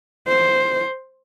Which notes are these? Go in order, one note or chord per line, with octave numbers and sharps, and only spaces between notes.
C5